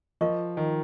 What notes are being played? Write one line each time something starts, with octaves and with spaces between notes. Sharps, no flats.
F3 F4 A#4 D#5 C#6
D#3